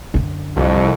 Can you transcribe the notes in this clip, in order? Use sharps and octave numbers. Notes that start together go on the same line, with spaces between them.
F#2 D3
C2 F2